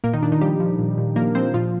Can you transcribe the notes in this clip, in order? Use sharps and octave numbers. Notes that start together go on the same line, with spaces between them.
A#2 A#3 A#4
D#3 D#4
A#2 D4
D#3 D#4
F3 G3 G4
F3
A#2
A#2
F3 A#3 A#4
F3 C4 C5
A#2 F3 F4